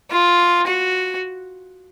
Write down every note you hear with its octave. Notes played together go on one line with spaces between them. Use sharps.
F4
F#4